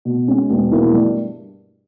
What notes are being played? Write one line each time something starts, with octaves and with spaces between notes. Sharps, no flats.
B2
G#3 C#4
E1
E2 B2 A#3 E4
G2